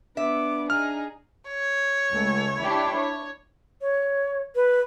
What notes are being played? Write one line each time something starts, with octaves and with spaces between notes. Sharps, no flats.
B3 D4 E5 D6
D#4 G#4 F6
C#5
C#2 A3
D4 E4 G4
C#5
C#5
B4